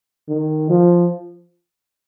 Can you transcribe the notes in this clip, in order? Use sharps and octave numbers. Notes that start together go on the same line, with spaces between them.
D#3
F3